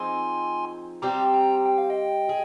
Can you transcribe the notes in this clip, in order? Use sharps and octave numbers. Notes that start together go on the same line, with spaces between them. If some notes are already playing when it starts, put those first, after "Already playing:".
Already playing: F3 C4 D#4 G#4 G#5 C6
G3 C4 G4 A#5 D6
G5 A#5
G5
F5
D#5 G5
G#4